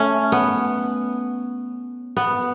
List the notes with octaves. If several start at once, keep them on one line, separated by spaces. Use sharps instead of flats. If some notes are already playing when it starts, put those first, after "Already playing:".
Already playing: A3 C#4
B3
B3